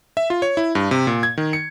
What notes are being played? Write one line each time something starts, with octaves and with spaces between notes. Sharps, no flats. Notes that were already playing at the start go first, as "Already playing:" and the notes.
E5
F4
C#5
E4
G2
C3
A#2
G#6
D#3
C#7